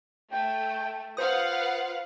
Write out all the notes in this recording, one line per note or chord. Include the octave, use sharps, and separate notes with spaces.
A3 G5
F4 B4 C5 F5 F#5 D#6